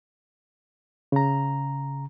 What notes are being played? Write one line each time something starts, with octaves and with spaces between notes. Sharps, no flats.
C#3 A#5